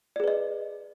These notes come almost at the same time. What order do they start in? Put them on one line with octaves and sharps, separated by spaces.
D5 G#4 B4 D#5